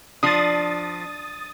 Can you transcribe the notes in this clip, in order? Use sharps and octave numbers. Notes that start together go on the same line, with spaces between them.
F3 D4 D#6 A6